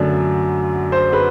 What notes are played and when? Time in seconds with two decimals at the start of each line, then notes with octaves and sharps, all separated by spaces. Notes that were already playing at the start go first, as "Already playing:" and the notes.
Already playing: F#2 D3 F#3 A3 D4
0.92 C5
1.13 B4